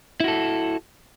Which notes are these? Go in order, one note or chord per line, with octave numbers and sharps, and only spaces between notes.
E4 F#4 A4